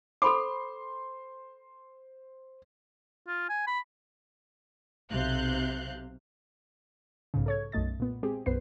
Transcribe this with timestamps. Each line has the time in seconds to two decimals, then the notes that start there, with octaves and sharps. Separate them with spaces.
0.22 A4 C5 B5 C6 D6
3.28 F4
3.50 G#5
3.67 B5
5.11 B1 C3 F5 F#6 G6
7.34 B1 G#2 C#3
7.46 A4 C#5 G#6
7.72 B1 F#2 A3 D#5 A6
7.99 A#2 B3
8.23 G#3 C4 G4 G#4
8.46 B1 F#2 B3 B4 C5 C7